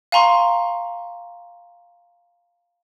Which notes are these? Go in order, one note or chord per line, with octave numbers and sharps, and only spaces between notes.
F5 G#5 A#5 C6 C#6